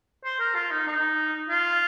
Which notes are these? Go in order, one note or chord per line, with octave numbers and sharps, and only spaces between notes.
C5
A#4
F4
D#4
D#4
F4